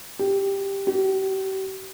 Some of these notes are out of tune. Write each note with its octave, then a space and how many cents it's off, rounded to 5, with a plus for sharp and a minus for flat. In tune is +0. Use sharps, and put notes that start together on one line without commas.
G4 +5
G4 -40